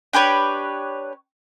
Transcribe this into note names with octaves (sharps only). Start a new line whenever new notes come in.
D4 G4 B4 C#5